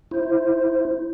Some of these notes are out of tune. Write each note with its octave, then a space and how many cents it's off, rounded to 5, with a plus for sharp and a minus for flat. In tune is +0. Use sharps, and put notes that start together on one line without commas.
E4 +0 C5 +0